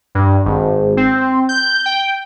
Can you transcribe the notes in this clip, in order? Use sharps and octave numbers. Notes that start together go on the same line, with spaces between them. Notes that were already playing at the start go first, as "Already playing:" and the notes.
G2
G#1
C4
G6
G5